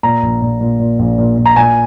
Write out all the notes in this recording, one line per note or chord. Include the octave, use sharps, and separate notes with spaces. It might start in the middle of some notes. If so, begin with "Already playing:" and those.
A#2 A#5
A#1
A#2
A#2
A#2
A#1
A#2
A#2
A#5
A#2 G#5